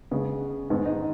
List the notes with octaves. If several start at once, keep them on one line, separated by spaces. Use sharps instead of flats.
C#3 G#3 B3
G#2 D#3 B3
D#4